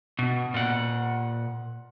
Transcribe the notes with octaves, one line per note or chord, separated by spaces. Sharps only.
B2
A#2 F#5